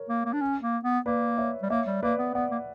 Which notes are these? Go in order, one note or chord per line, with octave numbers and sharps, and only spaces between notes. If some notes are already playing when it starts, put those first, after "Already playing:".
Already playing: A#4 C#5
A#3
A#3
D4
C#4
A#3
B3
A#3 B4 D5
C#5 E5
G3
A#3 C#5 E5
G3
A#3 B4 D5
B3
B3 D5 F#5
A#3